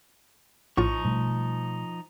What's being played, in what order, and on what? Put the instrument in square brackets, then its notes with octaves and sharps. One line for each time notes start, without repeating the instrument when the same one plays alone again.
[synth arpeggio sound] A#1 A2 F4 [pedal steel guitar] F3 D#4 C#6
[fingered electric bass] B2 G3 A3